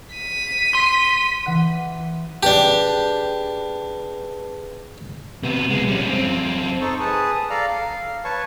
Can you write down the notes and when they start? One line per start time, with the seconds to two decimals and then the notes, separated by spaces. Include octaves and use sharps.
0.15 B6 D#7
0.75 C6
1.46 E3 F#5 F#6
2.43 D4 G4 G#4 B4 G5 A5
5.43 C3 B3
5.70 B1 G#3
5.87 G3 C#4
6.09 F#2 C4
6.81 D#4 A4 C5 C#6
7.00 G#4 B4 A5 D#6
7.50 A4 D5 F5 A#5 F6
7.68 F5
8.25 B4 C#5 A5 C#6